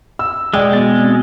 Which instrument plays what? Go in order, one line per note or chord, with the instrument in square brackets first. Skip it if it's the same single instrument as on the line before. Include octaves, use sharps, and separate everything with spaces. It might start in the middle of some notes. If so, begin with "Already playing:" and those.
[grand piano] E6
[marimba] B2 [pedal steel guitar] G#3 [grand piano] D5 G5
[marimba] B3 F#4 [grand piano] A6
[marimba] C4